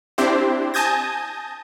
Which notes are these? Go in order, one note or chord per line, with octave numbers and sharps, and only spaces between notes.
C4 D4 E4 G4 C5
G#5 A5 D#6 G6 G#6 A#6